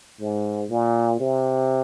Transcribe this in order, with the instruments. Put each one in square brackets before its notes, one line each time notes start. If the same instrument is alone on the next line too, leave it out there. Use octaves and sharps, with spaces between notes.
[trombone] G#2
A#2
C3